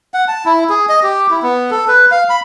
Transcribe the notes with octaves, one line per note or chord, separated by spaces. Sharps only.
F#5
A5
E4
G#4
D#5
G4
E4
B3
A4
B4
F5
B5